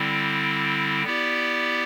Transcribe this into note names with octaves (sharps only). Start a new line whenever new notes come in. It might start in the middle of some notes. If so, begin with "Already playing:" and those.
Already playing: D3 G3 C4 E4
B3 E4 G4 D5